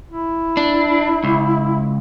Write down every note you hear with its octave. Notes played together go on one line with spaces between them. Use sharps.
E4
D4
C#2